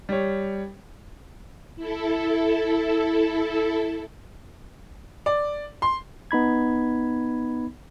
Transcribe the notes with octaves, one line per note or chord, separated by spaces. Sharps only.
G3 C#5
E4 A4
D5
C6
B3 D#4 B5 G#6